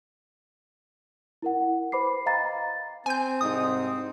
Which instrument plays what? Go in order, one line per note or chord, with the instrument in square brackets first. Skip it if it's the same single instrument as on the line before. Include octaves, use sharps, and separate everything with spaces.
[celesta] E4 A#4 F#5
B4 C5 B5 D6 C7
D#5 F5 G5 A#5 B5 A6
[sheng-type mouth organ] C4 [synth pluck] G#5 G6
[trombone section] C2 G#2 D#4 [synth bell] D#6